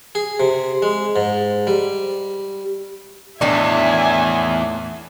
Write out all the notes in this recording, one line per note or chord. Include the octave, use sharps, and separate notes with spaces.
G#4
C3
G#3
G#2
G3
E2 A2 D#3 A3 D4 E5 G#5